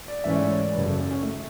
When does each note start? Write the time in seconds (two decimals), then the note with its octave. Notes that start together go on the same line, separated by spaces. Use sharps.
0.08 D5
0.24 G#2 E3 A3 C#4 E5
0.36 D5
0.48 C#5
0.60 D5
0.73 F#1 F#2 C#3 F#3 B4
0.86 A4
0.98 C#4
1.11 C#4
1.23 A3